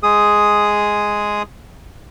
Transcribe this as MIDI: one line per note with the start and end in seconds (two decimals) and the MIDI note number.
0.03 1.42 56
0.03 1.42 68
0.03 1.42 87